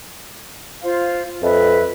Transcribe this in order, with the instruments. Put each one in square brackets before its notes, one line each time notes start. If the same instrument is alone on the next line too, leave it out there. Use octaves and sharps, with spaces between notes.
[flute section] F4 C5 F5
[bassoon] F2 [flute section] B4 D#5 E5